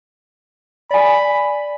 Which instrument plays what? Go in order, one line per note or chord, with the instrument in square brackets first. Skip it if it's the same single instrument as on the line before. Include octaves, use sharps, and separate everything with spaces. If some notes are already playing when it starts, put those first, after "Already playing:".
[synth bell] D5 G#5 [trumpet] B5